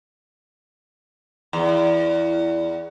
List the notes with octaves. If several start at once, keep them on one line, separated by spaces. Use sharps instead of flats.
E2